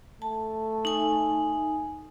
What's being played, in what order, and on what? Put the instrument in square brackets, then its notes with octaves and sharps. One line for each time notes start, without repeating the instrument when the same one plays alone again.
[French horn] A3 [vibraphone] A5
[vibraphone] D#4 G#5